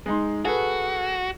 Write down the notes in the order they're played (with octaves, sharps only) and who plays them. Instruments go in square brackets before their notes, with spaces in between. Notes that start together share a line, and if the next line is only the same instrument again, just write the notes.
[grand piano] G#3 D#4 C6
[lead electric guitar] F#4 [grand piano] G#4 A4 B4